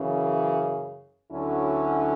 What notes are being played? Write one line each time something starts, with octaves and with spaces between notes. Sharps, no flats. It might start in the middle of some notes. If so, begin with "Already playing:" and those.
Already playing: F#2 C#3 E3
D2 D3 F#3 C#4 E4